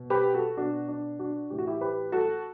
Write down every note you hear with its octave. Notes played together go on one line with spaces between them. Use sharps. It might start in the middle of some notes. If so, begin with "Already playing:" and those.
Already playing: B2
G4 B4
F#4 A4
B2 D4 F#4
D4
D4 F#4
A2 E3 G4
F#4
E4 G4
G4 B4
F#4 A4